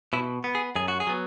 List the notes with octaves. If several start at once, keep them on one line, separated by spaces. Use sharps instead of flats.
B2 E4
B3
G#4
F#2 G#4
F#4
G#4
F#3 B3